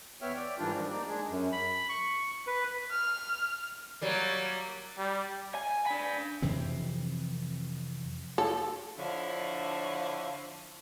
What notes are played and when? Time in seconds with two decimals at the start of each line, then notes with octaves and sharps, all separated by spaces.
0.22 E2 B3 C#5 E5 G5 F6
0.36 D5 G5
0.59 G#2 D#3 E3 G3 D4 F4
0.73 D#3 F3 G3
0.91 A#3 D#4 D5
1.08 G#3 D4 G#4
1.30 F#2
1.52 B5
1.89 C#6
2.47 B4
2.91 F6
4.01 F#3 G3 A#3
4.98 G3
5.55 G#5
5.87 D4 B5
6.42 F2 C3 E3 C4
8.38 A4
8.97 D3 F3 D4 E4 C#5 F5